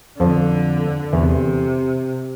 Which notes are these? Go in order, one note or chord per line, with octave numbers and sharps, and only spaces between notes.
F2 D3 F3
E2 C3 E3